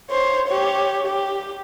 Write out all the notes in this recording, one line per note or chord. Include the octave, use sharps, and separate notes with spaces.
C5 C#5
G4 C#5
G4